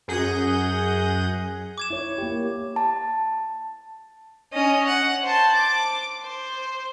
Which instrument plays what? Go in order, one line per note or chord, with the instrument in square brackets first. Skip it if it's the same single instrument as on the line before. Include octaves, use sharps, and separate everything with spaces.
[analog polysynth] F#2 G#4 F#5 G6 A#6 D#7
[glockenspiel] D6 G#6 E7
[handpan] E4 C#5
A#3 G4
[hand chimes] A5
[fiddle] C#4 D#5
F#5
C5 A5
D6
C5